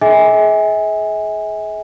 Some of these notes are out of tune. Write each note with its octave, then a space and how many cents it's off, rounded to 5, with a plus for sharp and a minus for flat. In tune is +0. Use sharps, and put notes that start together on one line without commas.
G#4 +30 E5 -45 G#5 -20